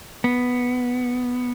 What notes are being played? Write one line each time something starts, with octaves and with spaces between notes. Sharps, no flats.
B3